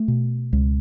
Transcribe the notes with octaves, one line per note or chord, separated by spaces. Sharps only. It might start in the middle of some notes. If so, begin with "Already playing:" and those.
Already playing: A3
B2
C#2